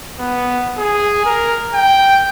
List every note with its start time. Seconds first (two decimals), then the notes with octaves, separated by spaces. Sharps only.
0.19 B3
0.77 G#4
1.25 A#4
1.74 G5